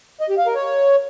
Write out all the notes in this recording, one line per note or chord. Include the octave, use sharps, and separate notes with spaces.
D#5
G4
F5
A#4
C#5